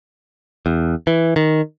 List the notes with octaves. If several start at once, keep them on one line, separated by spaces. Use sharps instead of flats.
E2
E3
D#3